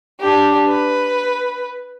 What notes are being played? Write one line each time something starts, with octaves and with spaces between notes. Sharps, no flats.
D4 G4
B4